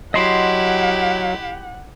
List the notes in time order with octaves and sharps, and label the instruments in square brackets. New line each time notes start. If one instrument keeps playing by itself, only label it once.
[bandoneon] F#3 [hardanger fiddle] E4 G4 [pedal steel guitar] D#5 C6 [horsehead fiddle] F#5